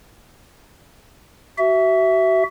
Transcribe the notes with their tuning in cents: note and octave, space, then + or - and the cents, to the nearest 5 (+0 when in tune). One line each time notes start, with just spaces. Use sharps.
F#4 +35 E5 +0